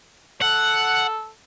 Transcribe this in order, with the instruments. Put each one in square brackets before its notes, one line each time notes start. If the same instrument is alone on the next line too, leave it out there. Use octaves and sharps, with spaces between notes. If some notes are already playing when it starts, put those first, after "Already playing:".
[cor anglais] A4 [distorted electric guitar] F#5